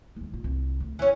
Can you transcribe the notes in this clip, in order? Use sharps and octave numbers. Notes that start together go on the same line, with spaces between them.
D#2 G#3
A#2 F4
C2
D2
E3 C#4